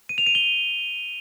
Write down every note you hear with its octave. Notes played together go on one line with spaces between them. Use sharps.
D#7
F7
D#7
G7